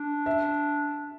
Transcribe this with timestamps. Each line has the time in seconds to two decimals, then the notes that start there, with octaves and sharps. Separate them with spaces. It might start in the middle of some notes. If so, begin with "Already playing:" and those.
Already playing: D4
0.26 E5